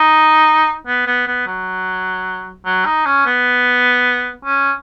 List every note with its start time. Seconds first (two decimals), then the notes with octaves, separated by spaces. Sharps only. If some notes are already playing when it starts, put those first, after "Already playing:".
Already playing: D#4
0.87 B3
1.07 B3
1.27 B3
1.47 F#3
2.66 F#3
2.86 D#4
3.06 C#4
3.26 B3
4.45 C#4